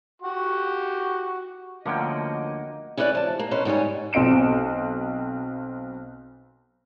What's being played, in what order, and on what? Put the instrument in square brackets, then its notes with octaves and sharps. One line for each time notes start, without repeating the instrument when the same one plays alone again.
[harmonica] F#4 G4 C#6
[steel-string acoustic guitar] D2 [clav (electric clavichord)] D3 F3 C#4 [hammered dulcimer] A#3 F#5 G5 [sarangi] D#5
[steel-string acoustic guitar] C#4 E4 G4 B4 C5 D5
F3 A5
A#3
B2 C#4 B4 C5
G#2 G3 C#5 G#5
[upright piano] B1 C4 D#5 D7 E7